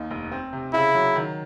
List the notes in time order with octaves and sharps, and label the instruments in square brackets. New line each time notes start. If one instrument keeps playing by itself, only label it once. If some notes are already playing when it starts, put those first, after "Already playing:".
Already playing: [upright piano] D#2 D#4
F1
C4
C3
[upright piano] C#3 [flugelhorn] E4
[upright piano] F#3
D#3